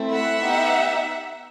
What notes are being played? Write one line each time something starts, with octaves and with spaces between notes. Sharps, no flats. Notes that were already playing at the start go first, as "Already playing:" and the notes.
Already playing: A3 C4 E4
E5 F#5
B3 D#4 G4